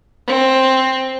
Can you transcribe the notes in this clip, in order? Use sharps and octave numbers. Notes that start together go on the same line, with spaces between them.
C4